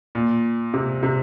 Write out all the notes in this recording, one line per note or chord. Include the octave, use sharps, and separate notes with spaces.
A#2
C3
C3